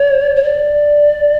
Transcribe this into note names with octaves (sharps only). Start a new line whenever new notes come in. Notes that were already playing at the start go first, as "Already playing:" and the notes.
Already playing: C#5
C#5
D5